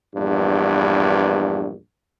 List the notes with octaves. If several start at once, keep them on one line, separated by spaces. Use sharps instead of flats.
A#1 E2 G2